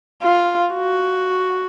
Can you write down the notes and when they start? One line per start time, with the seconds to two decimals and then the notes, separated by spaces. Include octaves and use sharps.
0.23 F4
0.74 F#4